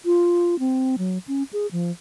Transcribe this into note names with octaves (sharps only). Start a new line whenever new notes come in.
F4
C4
F#3
C#4
G#4
F3